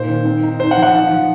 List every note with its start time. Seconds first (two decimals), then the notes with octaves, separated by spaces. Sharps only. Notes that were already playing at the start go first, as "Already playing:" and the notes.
Already playing: A#2 D#4 C5
0.09 D#3
0.25 C4
0.43 D#4
0.60 D#4 C5
0.71 F#5
0.77 F3
0.83 F#5
0.94 D#4
1.12 F3